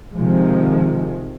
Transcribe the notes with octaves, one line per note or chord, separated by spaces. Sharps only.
C3 D#3 F3 G#3